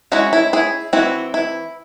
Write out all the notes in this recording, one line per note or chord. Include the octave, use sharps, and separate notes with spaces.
G#3 C#4 E4 F#4
E4
E4 G#4
E3 C4 E4 F#4
E4